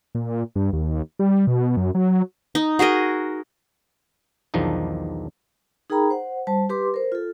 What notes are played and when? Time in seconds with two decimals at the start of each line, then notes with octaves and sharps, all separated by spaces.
0.15 A#2
0.56 G2
0.73 D#2
1.19 G3
1.47 B2
1.77 F#2
1.95 F#3
2.55 D#4
2.79 F#4 G#4 A#4 D#5
4.54 B1 E2 D#3 F3 D4 D#4
5.90 D#4 G#4 A#4 G5 A#5 B5
6.10 C5 F#5
6.47 G3 C5 A5
6.69 G4 B4 C6 D6
6.94 A#4 C5
7.12 F4 A4